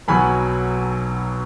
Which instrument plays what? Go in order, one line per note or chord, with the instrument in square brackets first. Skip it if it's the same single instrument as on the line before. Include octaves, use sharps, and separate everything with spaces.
[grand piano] B1 B2 F#3 G#5 B5